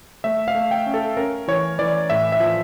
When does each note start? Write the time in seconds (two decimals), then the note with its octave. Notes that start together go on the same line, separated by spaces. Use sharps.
0.24 A3 E5
0.48 F5
0.55 A3
0.71 G5
0.86 C#4
0.94 A4
1.17 C#4 A#4
1.48 E3 C#5
1.79 E3 D5
2.10 A2 E5
2.32 E5
2.40 F3